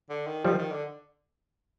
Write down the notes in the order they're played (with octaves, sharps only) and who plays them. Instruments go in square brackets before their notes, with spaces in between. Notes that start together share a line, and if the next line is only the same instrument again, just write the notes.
[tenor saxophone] D3
D#3
[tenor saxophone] D#3 [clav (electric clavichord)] F3 G3
[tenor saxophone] D#3
D3